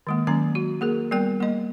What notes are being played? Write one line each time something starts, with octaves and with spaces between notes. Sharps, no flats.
D#3 G#3 A#3
D#3 F#3 A#3 C#4 A#5
F#4
A#3 G#4 A#4
G3 B3 A#4 G5
A#3 D#5